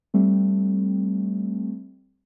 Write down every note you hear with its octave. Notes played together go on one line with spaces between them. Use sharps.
G3 A3 C4